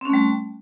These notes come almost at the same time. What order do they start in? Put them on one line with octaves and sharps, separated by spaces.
C4 C#4 A3 G3